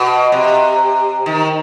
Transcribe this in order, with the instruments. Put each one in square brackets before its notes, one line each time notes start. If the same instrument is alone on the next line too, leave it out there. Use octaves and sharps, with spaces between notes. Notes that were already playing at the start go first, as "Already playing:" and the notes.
Already playing: [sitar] B2
C3
D#3